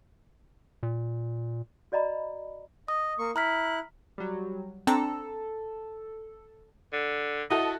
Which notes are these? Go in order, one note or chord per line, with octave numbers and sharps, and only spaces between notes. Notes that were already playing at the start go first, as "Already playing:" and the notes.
A#2
F#4 D5 D#5 A#5 B5
D#5 D#6
A#3 C#6
E4 A#5 F6 F#6 B6
F#3 G3
C4 D4 A4 A#5
D3
E4 F#4 A4 D#5